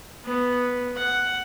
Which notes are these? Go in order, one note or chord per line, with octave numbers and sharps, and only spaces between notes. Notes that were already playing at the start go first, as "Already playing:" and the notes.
B3
F#5